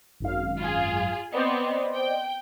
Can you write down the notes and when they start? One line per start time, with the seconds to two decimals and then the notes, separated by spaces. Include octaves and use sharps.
0.20 G#1 F#2 F5
0.59 F4 G#4
1.32 B3 C4 C5 D5 D#5
1.95 G5